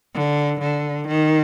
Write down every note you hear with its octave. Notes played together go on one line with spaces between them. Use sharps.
D3
D3
D#3